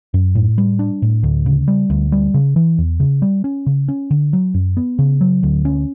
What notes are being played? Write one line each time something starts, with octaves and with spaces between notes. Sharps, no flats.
F#2
A2
G3
D4
A2
D2
C#3
G3
D2
G3
C#3
E3
E2
C#3
G3
C#4
C#3
C#4
D3
F#3
F#2
B3
C#3
F#3
D2
C#4